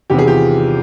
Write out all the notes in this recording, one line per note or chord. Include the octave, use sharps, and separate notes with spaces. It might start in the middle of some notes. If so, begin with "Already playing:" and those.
E2 C3 D#3 G4
G#4
F4 G4